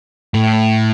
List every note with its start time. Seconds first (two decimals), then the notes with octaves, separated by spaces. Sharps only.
0.34 A2